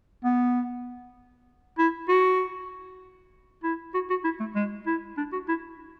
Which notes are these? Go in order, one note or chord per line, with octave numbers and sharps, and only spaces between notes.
B3
E4
F#4
E4
F#4
F#4
E4
A3
G#3
E4
D4
F#4
E4